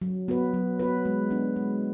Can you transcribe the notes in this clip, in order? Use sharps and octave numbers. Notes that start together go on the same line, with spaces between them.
F#3
B3 F#4 B4
F#3
B3 F#4 B4
G#3
B3 D4
G#3